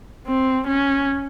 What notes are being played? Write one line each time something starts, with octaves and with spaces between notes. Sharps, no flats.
C4
C#4